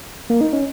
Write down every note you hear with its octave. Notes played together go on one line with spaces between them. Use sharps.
A#3
D#4
C#4